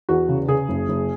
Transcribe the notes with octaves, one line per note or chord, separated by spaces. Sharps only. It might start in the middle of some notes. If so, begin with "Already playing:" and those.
E2 F#4
C#3
C#3 G#4
F#1
F#1